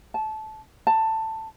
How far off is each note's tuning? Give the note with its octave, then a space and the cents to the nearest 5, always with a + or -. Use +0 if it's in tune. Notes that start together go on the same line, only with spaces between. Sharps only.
A5 -20
A5 +15